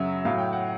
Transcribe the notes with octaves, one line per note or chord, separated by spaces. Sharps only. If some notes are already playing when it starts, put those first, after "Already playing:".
Already playing: F#2 C#3 F#3 E5
A2 F#3 F5
G5
F#5